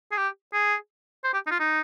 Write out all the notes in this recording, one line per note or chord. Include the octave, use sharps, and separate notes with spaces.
G#4
G4
G#4
C5
G4
D#4
F4
D#4